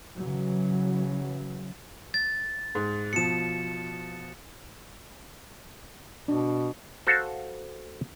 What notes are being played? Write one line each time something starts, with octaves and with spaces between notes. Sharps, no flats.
C#3 E3 F#3
A6
G#2
B2 F3 C#7 E7
B2 D4
F#4 A4 C5 F5